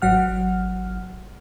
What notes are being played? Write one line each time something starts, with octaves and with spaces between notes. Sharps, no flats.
G#1 F#3 F#5 F6